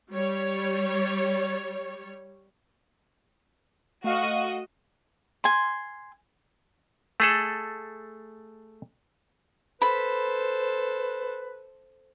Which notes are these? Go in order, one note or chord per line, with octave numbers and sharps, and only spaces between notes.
G3 C#5
A3 F#4 D#5 F5
G#5 C6
A3 G#4 A4
A4 B4 C5 B5